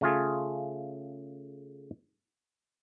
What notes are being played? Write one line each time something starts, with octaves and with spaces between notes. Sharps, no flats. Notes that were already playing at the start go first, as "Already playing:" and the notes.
C#3 A3 F4 G#4